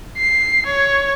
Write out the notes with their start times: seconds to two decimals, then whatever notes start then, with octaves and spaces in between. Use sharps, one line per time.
0.17 C7
0.66 C#5